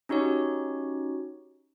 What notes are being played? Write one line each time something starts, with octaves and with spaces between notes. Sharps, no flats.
C#4 D#4 F#4 G4 C#5